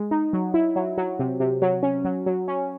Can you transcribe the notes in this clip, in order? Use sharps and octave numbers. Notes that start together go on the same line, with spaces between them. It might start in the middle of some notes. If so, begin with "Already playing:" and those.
Already playing: G#3
D#4
F#3
E4
F#3
F#3
C3
C3
F#3
C#4
F#3
F#3
C#4